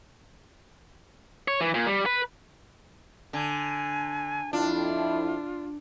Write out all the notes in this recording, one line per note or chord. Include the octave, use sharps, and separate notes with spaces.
C#5
E3
A#2
G3
B4
D3 G#5
F2 D4 E4 F4